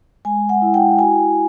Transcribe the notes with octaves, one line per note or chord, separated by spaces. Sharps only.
G#3 G#5
F#5
E4
G5
F#4 G#5